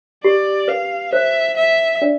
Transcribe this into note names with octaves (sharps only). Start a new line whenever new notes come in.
G4 D5
B4 F5
C5 E5
E5
D4 D5